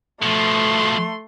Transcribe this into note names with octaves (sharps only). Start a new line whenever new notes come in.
B2 F3 A3 C6